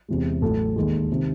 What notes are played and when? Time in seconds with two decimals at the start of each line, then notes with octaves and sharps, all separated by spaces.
0.08 E2 C3 E3 G#3
0.42 A1 A2 F#3 A4
0.76 D#2 D#3 G#3
1.12 C3 D#3